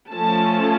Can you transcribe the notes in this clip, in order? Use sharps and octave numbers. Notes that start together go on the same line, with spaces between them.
F3 A3 C#4 A5